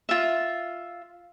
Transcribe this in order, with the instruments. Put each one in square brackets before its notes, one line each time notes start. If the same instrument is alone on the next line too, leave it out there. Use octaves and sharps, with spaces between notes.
[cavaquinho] F4 E5